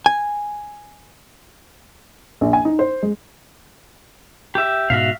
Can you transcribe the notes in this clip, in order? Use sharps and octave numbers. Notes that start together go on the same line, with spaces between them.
G#5
A#1
G#5
D#4
C5
G#3
G4 E5
G#2 B2 F#4 E5 F5